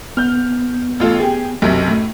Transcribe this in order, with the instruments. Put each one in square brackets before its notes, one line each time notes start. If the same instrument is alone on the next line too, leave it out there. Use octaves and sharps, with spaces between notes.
[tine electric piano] B3 [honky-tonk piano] F6 G6
[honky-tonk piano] A1 F4 A4
G4 G#4
B1 F#2 C3
A2